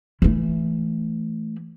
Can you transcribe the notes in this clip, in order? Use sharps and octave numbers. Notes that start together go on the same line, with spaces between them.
E3 A3